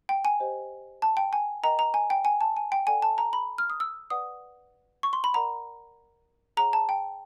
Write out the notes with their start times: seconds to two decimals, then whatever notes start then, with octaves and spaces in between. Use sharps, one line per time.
0.09 G5
0.25 G#5
0.40 G4 C5 D#5
1.02 A5
1.17 G5
1.33 G#5
1.63 A#4 D#5 G5 A#5
1.79 A#5
1.94 G#5
2.10 G5
2.25 G#5
2.41 A5
2.57 G#5
2.72 G5
2.87 A4 D5 F#5 G#5
3.02 A5
3.18 A#5
3.33 B5
3.58 F6
3.70 D#6
3.80 E6
4.10 B4 D5 F#5 D#6
5.03 C#6
5.13 C6
5.24 B5
5.34 A#4 D5 F#5 A#5
6.57 G#4 C#5 F#5 A#5
6.73 A5
6.89 G5